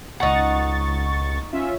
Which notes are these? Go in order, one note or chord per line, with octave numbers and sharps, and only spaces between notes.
C#2 D#4 F#5 C#6 A6
C#4 F4 E5